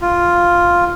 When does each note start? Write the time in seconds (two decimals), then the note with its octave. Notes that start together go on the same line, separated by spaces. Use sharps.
0.02 F4